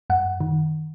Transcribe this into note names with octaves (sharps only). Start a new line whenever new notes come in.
F#2 F#5
D#3